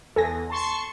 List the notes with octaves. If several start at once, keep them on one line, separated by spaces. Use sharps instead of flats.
E2 A4 G#5 A#6
A5 C6 C#6